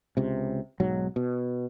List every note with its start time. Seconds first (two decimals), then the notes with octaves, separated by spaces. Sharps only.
0.17 C#2 C3
0.80 B1 G#2 F#3
1.16 B2